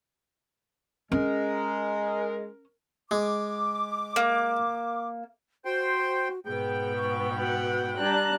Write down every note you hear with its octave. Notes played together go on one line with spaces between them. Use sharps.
G#3 C#4 A#4
G#3 D6
A#3
F#4 C5 G5 C6
G#2 B2 B3 G#4 G5
C#6
F#4 F#5
G3 D4 A5 A#5 F#6